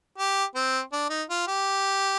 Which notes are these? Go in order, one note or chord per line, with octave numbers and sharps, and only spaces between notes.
G4
C4
D4
D#4
F4
G4